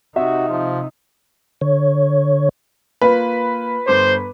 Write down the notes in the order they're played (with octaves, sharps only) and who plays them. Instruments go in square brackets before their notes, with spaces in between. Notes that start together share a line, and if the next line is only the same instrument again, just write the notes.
[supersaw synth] C3 [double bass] D#4 [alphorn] F#4 [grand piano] E5
[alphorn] F3
[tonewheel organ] D3 C#5
[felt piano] A#3 F4 [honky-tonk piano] B4
[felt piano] G1 D6 [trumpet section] C5